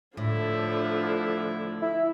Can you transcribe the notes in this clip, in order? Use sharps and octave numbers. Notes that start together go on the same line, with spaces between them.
A2 D3 F3 E4
E4